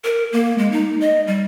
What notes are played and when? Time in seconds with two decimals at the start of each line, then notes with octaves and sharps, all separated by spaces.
0.04 A#4
0.32 A#3
0.58 G#3
0.72 D#4
1.01 D#5
1.27 G3